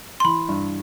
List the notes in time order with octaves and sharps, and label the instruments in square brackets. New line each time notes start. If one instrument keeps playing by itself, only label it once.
[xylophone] C6
[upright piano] E3 [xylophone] B5
[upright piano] G2